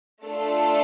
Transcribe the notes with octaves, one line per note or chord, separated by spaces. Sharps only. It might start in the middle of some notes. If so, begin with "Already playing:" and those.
A3 D4 F4 A4